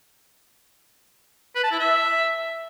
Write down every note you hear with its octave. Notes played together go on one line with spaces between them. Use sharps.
B4
A5
E4
E5